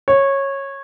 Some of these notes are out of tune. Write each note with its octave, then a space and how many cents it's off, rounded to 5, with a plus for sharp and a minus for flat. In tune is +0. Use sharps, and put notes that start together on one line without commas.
C#5 -15